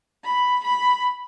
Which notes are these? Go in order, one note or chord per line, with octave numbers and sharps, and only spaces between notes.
B5
B5